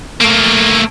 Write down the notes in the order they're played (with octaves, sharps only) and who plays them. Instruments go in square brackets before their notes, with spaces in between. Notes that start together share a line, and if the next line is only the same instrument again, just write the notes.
[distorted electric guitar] A3 A#3